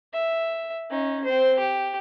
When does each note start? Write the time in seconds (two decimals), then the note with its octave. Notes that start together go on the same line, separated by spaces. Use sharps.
0.13 E5
0.90 C#4 D#4
1.24 C4 C5
1.59 G4